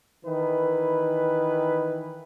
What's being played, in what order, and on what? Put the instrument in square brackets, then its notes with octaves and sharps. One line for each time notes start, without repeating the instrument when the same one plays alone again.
[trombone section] D#3 E3 B4